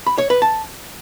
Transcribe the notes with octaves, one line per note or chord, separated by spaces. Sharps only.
B5
C#5
B4
A5